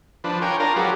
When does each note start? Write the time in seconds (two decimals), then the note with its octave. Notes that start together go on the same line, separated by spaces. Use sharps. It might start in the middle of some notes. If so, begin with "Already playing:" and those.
0.24 F3 D4 B4
0.42 A#4 C#5 G5 G#5
0.60 D4 F4 A#4 G#5 A#5
0.76 F#3 G4 G#4 B4 D5